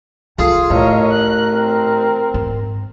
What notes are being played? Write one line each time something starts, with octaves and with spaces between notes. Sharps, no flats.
C2 F4 G#4 A4
A1 A2 A#4 C#5 D#5
F#6
C4
G#2